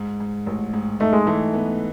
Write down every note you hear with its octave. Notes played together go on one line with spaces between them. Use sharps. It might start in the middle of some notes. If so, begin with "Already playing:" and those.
Already playing: G#2
G#2
A1
G#2
A3 D#4
G#3
E3 A3
B3